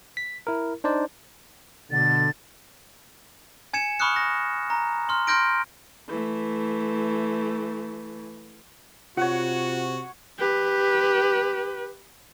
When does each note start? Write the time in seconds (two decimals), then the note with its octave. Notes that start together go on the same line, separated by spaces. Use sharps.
0.17 B6
0.47 E4 A#4
0.84 D4 D#4 C5 D5
1.91 B2 D3 A6
3.73 G#5 G#6 C#7 E7
4.00 B5 C#6 D#6 F6 F#6 C#7
4.16 A#6
4.70 A#5
5.09 C6 F6
5.27 C6 F6 G6 A#6 D7
6.08 E3 A3
9.17 C3 F4 F#4 C#5 F#5
10.38 G4 B4